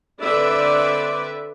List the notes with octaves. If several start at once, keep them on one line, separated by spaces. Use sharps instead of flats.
D3 C4 D4 B4 D5 E5